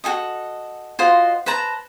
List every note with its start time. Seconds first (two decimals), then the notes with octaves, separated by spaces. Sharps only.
0.04 F#4 G#4 A4 D#5
0.99 F4 F#4 C5 D#5
1.46 B4 C5 A5 A#5